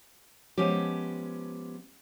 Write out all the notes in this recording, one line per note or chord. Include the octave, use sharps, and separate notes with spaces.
F3 G#3 B3 C#4 G4